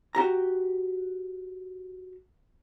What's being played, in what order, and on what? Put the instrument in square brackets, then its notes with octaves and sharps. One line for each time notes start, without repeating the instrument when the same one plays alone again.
[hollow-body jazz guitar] F#4 G4 A#5